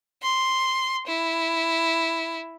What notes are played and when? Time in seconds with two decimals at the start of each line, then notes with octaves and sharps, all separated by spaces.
0.23 C6
1.07 E4